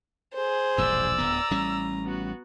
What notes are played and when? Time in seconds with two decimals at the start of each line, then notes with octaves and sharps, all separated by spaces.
0.34 G#4 C5
0.78 E1 A#1 G2 D5 E6
1.18 D1 D2 B3 A#5
1.51 A1 G3 C#4
2.05 B3 F#4